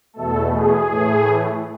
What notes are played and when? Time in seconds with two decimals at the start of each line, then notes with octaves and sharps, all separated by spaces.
0.14 E2 B2 A3 A4
0.51 G#4
0.88 A2 E3 A3